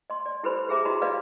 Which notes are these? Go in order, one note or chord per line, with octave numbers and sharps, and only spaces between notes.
D#5 C6
D5
E4 G4 A4 B4 C5 B5
G4 G#4 E5 A#5 D6
E4 F#4 G4 D#5 A#5 B5
B4 D5 D#5 F5